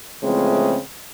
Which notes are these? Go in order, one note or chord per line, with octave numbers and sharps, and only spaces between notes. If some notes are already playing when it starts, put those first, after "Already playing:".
C#3 E3 F3 G#3 A3 C4